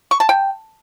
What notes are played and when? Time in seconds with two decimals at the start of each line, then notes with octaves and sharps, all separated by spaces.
0.11 C#6
0.20 A5
0.29 G5